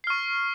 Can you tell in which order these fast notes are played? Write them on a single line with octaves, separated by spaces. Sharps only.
C7 F6 C#6